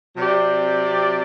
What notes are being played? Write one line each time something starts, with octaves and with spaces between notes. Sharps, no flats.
C3 F#3 C4 G4 D5